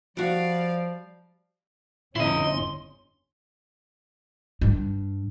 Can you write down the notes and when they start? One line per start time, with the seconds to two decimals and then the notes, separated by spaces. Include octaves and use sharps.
0.17 F3 G3 F#4 D5 F5
2.16 G1 F2 C#4 E4 D#5 C6
4.61 G2